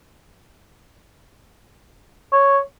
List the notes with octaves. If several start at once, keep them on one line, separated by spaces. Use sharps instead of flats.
C#5